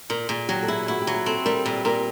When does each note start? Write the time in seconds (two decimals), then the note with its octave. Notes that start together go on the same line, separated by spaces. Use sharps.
0.10 A#2 A#4
0.29 A#2 G#4
0.49 F#3 G4
0.63 A4
0.68 E4 G#4
0.88 E4 F#4
1.02 G4
1.07 F#3
1.14 G#4
1.26 C4 A4
1.46 G3 A#4
1.65 A#2 B4
1.85 A#2 A#4